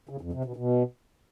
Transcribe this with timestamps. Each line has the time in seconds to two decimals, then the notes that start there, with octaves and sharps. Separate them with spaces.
0.09 C#3
0.21 F2
0.33 C3
0.45 B2
0.56 B2